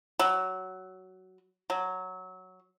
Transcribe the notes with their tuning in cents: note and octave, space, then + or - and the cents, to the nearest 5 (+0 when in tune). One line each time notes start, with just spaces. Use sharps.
F#3 +10
F#3 +0